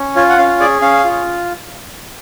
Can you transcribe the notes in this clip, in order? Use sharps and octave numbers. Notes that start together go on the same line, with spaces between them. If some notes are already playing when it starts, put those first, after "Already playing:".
Already playing: C#4
F4 C#5
F#5
C#4 F5
G#4 D5
C#4 F5
F4